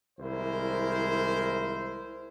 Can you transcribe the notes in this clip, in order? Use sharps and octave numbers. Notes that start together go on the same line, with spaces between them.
C2 D#3 G#3 E4 A#4 C5